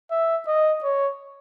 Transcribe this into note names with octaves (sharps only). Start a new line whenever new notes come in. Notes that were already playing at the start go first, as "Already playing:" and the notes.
E5
D#5
C#5